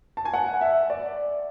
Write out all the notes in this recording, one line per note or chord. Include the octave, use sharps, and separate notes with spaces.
A5
G#5
F#5
E5
D5